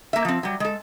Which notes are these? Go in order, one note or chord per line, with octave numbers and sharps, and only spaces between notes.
A#3 E5
F3 C4
F#3 G3
G#3 A4